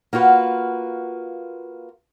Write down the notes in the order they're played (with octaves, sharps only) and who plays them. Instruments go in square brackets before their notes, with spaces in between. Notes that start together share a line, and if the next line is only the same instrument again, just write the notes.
[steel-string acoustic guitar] A#3 F4 F#4 B4